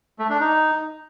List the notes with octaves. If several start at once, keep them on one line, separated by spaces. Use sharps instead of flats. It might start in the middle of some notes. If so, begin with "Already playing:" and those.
A3
D4
D#4